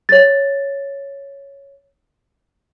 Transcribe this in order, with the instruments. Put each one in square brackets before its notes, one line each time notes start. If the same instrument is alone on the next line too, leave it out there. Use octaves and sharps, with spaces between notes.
[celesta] C#5 A6